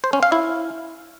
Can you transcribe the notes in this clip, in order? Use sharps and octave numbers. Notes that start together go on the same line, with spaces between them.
C5
C#4
F5
E4